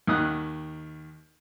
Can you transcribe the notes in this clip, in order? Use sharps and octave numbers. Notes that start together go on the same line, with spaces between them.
D#2 D#3 D#6 F#6